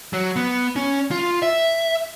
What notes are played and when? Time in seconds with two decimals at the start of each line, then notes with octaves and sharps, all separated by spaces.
0.13 F#3
0.36 B3
0.76 C#4
1.11 F4
1.42 E5